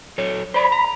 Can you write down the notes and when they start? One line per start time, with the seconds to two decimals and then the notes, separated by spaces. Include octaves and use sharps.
0.18 F#3 A4 C#5
0.54 C5 D5 B5
0.72 A#5